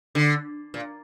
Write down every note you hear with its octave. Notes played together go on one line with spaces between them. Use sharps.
D3
A#2